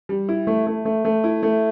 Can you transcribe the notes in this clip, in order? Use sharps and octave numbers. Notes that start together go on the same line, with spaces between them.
G3
E4
A3
A3
A3
A3
E4
A3